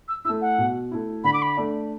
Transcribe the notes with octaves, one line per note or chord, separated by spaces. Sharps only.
E6
A3 E4 E6
F#5
B2
A3 E4
D3 B5
D6
B5
A3 D4